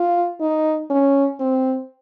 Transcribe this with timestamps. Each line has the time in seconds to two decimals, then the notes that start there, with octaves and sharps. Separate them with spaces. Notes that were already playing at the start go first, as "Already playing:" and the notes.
Already playing: F4
0.41 D#4
0.90 C#4
1.40 C4